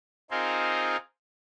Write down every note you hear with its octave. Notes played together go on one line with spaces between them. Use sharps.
C4 D#4 F4 G#4 A#4 C5